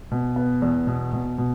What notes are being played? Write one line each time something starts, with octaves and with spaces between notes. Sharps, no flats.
B2
B3
E2
B2
B2
B2